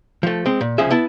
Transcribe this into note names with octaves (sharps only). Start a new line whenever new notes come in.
F3 A3
G#3 C4
A#2
C2 C#3 F3 G#4 E5
B3 E4 A5